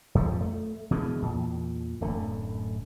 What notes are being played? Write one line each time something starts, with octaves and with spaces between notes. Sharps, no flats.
F2 F3
A3
B2 D3 E3 G#3
E2 A#2
D1 F#2 D3 A3